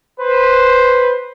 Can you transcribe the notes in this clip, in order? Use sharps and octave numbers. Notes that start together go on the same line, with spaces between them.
B4 C5